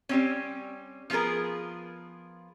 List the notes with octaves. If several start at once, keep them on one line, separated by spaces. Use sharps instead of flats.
G3 C4 C#4
F3 B3 F4 G#4 A#4